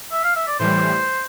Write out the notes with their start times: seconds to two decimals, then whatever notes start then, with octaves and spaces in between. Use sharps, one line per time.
0.12 E5
0.24 F5
0.36 E5
0.47 D5
0.59 A2 E3 G3 C5